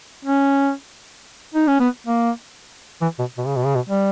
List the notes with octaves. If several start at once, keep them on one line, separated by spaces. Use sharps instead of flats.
C#4
D#4
C#4
B3
A#3
E3
B2
B2
C#3
B2
C#3
B2
G3